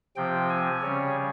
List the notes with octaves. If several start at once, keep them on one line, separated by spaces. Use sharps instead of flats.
C3 F3 C4 G5
G#5
C#3 G3 C#4 C#5